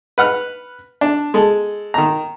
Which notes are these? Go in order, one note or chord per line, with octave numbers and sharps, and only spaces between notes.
B4 F#5 F6 F#6
D4
G#3 A4
D#3 A#5